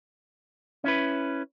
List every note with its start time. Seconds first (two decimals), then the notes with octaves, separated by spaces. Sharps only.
0.84 C#4 E4 B4